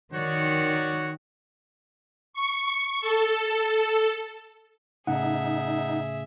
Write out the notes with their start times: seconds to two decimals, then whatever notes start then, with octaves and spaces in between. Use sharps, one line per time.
0.13 D#3 F#4 C#5 D5
2.33 C#6
3.01 A4
5.07 A2 C#3 D#4 G#4 E5 F#5